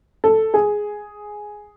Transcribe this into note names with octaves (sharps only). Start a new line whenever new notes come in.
A4
G#4